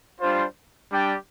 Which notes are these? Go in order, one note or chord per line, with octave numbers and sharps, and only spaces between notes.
G3 D4 F4 C5
G3 D4 G4 D5 G5